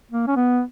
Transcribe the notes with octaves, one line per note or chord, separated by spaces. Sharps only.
A#3
C#4
B3